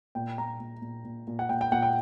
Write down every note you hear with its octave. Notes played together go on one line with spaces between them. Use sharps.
A#2 G5
A#2 A#5
A#2
A#2
A#2
A#2
F#5
A#2 G5
G5
A#2 F#5
G5